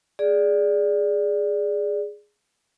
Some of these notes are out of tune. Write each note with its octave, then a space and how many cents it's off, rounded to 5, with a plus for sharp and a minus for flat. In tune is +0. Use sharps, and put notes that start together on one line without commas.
G#4 +0 D5 +0